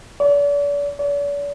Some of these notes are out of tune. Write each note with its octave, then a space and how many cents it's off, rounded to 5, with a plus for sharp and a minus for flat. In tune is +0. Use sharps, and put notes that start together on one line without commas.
D5 -40
D5 -45